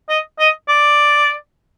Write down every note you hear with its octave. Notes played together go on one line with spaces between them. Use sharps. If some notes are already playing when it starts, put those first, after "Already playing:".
D#5
D#5
D5